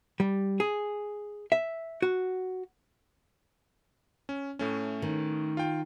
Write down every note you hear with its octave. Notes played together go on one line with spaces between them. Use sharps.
G3
G#4
E5
F#4
C#4
A2 A3 C#4
D#3
F4 G5